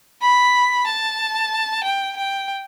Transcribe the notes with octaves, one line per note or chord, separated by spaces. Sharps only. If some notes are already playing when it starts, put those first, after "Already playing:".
B5
A5
G5
G5